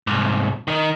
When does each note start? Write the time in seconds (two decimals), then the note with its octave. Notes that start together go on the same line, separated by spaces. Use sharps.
0.07 C2 G#2
0.68 D#3 D#4